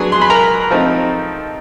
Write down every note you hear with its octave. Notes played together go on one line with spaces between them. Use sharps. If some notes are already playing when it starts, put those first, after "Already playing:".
Already playing: F#3 B3 D4 G#4 G#5
C6
B5
A#4 A#5
F3 A3 C4 D#4